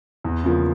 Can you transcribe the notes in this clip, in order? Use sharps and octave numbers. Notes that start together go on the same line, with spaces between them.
E2
C#3 F3 A#3